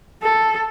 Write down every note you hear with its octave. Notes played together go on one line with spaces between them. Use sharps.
A4